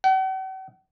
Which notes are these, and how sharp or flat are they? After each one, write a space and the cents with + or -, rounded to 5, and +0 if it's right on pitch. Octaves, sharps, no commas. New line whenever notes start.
F#5 +45